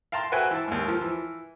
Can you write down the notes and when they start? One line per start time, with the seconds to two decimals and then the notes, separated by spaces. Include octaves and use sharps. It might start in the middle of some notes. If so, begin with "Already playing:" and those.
0.12 F5 G5 A5 A#5 C6
0.32 F#4 B4 C5 E5 G5 G#5
0.51 E3 A5
0.68 D#2 G#2
0.88 F3
1.01 E3